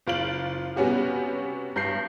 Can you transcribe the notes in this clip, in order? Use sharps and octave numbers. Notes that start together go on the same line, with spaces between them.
F#1 F4 D7 F#7
C3 G3 B3 C#4 F#4 G4
G2 G6 C7